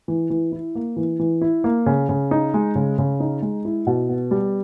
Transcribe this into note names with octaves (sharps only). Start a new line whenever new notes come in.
E3
E3
E4
A#3
E3
E3
E4
A#3
C#3
C#3
D#4
G#3
C#3
C#3
D#4
G#3
E4
B2
B3
G3